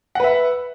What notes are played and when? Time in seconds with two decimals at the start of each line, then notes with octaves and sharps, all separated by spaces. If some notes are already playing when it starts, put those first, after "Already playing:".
0.15 F#5
0.20 B4
0.24 E5